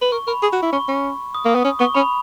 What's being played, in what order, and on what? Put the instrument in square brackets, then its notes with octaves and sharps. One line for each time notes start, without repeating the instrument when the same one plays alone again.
[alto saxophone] B4
[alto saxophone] A#4 [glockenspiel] C#6
[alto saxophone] A#4 [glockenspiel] B5
[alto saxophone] G#4
F#4
E4
[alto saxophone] C#4 [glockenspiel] C#6
[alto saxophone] C#4
[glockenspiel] D#6
[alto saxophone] A#3 [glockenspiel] D#6
[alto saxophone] B3
C#4
[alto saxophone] B3 [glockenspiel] C#6
[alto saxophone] C#4 [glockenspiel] B5